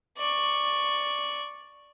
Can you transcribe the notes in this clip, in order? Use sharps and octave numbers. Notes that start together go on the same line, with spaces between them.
D5 C#6